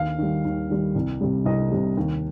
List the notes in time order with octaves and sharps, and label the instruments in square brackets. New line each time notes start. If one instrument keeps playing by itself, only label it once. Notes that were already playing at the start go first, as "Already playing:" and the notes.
Already playing: [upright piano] D#2 F5
D#3 G3
D#2
D#3 G3
C2
C3 G3
C2 D#5
C3 G3
D#2